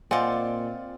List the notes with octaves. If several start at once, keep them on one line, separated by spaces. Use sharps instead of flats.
A#2 C4 F4 D5 D#5 F#5 G#5